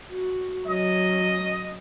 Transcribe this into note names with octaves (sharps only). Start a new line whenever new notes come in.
F#4
F#3 C#4 D#5